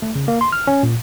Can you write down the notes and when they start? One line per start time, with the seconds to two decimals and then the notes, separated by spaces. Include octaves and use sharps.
0.02 A3
0.15 C#3
0.28 A#3
0.41 C6
0.52 F6
0.67 C#4
0.83 A#2